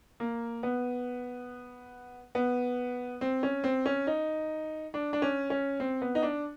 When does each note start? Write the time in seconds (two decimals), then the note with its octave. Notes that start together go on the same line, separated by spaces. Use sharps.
0.20 A#3
0.63 B3
2.35 B3
3.21 C4
3.43 C#4
3.64 C4
3.86 C#4
4.07 D#4
4.94 D4
5.13 D4
5.22 C#4
5.50 C#4
5.80 C4
6.01 B3
6.15 D#4
6.23 D4